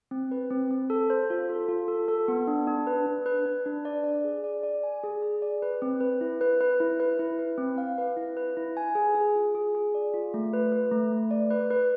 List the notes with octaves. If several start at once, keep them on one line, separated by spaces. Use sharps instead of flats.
C4
B4
C4
C4
A4
C5
F4
A4
F4
A4
A4
B3
D4
D4
B4
D4
B4
D4
D4
D5
D5
G#4
D5
D5
G#5
G#4
G#4
D5
B4
C4
B4
E4
B4
B4
E4
B4
E4
B4
C4
F5
B4
E4
B4
E4
G#5
G#4
G#4
F4
G#4
G#4
D5
F4
A3
B4
B4
A3
A3
D5
B4
B4